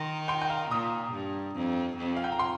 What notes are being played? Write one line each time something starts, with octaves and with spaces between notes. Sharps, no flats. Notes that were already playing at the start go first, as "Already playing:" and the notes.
Already playing: D#3 C6
G5 C6
G5
F5 A#5
A#2 A#5 D#6
G2
F2
F2
F5
G5
A#5
G5 C6